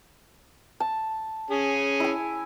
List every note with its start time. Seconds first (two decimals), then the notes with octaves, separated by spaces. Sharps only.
0.80 A5
1.50 C#4 G#4
2.00 E4 G#5